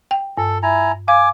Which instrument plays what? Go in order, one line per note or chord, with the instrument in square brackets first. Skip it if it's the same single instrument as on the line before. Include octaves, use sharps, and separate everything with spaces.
[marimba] G5
[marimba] G2 [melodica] A4
[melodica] E4 G#5 A#5
[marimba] F5 [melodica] G#5 D6